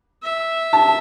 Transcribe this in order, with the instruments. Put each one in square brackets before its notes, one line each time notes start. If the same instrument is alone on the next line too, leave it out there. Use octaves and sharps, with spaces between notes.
[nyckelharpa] E5
[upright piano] A5